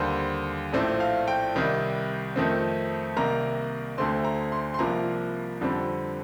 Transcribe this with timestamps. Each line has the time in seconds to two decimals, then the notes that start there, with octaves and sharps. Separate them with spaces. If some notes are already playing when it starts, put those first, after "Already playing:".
Already playing: D#2 D3 G3 C5
0.73 A#1 A2 A3 C4 D5
1.00 F5
1.28 G5
1.55 C2 C3 D#3 G3
2.36 F2 D#3 A3 C4
3.16 C2 C3 D#3 A#3 A#5
3.98 D2 D3 A3 C4 C6
4.25 A#5
4.52 C6
4.74 C6
4.79 C2 C3 F3 A#3 A#5
5.61 F2 D3 G3 C4